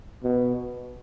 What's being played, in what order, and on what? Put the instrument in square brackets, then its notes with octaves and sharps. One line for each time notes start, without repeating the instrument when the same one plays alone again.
[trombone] B2